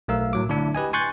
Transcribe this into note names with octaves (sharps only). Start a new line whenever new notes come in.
B1 A3 A#4 F5 E6
A2 F#3 D6
D3 A3 D4 E4
G4 B4 D#5 G#5
G#5 C6 C#6 F#6 G6 A6